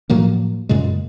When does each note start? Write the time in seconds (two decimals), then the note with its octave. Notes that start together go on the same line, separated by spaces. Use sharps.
0.10 A2 F3 F#3 A#3
0.69 F#2 A#2 C#3 G#3